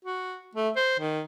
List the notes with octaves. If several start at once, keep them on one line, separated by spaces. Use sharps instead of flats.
F#4
A3
C5
D#3